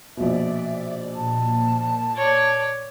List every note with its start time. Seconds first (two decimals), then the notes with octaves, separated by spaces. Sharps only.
0.17 A#1 B2 D5 E5
1.16 A#2 A5
2.16 C#5 D5